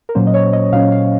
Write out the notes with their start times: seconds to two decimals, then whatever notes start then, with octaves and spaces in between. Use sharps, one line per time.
0.09 A#4
0.15 A#2 F#3 A#3 C#4 C5
0.27 D#5
0.34 C#5
0.53 D#5
0.73 A#2 F#3 A#3 C#4 F5
0.92 F5